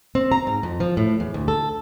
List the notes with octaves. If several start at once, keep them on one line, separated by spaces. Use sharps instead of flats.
C4
A#5
G#2
F2
F3
A2
E2
D2
A4